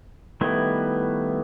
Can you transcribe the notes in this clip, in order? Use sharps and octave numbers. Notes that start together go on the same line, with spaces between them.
D#3 G3 A3 B3 E4